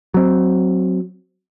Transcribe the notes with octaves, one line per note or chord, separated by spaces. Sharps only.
F#3 C4